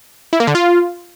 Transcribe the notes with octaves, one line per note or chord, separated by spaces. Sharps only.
E4
A#3
D3
F4